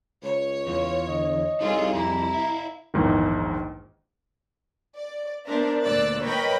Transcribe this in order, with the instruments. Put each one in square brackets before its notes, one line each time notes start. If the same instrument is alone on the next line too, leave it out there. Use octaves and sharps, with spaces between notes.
[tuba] C#2 [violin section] C#5
[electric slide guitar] E2 [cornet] F4
[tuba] D3 [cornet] D#5
[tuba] C2 [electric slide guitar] D#4 A4 C#5 [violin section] F4 G#4
[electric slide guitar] F2 [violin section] E4 [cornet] A#5
[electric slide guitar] E5 F5
[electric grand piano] A#1 E2 G#2 D#3
[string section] D5
B3 D4 A#4 C5 E5
D2 A#2 D5 E6 F#6 A6
A#4 B4 C#5 D#5 G5 B5